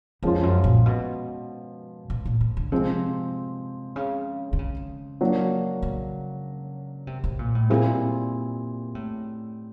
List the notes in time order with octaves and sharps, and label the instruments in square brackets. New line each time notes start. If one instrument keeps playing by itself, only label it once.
[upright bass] F2 [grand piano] F3 G#3 C#4 F4
[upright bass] F#2
A#2
B2
B2
A#2
B2
D3
[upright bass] C3 [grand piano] F3 G#3 C4
[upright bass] C#3
D3
C#3
[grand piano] F#3 A#3 D4 F#4
[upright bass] C#3
C3
C3
A#2
A2
[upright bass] A#2 [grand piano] G3 C4 E4 G#4
[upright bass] A2